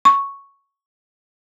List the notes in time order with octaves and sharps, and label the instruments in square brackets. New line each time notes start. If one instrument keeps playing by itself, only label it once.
[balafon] C#6